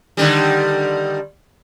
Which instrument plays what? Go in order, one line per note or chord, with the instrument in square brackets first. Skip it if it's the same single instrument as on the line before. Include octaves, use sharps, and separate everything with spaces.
[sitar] D3 D#3 G3